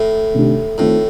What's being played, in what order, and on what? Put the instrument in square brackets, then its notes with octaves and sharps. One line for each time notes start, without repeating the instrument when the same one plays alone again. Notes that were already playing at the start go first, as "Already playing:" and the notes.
Already playing: [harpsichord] A2
[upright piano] C3 D#3 A3 D4 G4
[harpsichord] A2 [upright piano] D#3 A3 C4 F4 A4